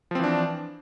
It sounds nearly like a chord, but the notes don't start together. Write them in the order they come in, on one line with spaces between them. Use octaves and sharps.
F3 C4 E3 D4